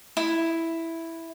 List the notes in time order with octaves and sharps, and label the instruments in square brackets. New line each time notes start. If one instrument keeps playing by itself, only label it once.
[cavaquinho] E4